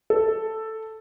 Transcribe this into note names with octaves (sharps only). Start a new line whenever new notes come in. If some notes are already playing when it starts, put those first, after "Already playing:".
A4